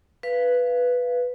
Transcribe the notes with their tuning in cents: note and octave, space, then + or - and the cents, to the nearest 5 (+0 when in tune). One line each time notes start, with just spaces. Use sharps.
B4 +0 F5 -20